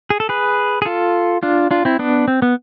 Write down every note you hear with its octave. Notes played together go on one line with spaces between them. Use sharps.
G#4
A4
G#4 B4
G#4
F4 A4
D4 F4
D4 F4
C4 E4
B3 D4
C4
B3